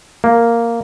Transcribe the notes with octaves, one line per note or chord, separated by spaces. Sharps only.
A#3